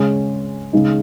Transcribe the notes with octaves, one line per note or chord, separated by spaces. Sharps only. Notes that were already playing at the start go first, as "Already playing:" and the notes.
Already playing: C#3 G#3 C#4
C#3 G#3 D#4